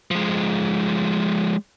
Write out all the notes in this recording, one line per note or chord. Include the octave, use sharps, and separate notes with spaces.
F3 G#3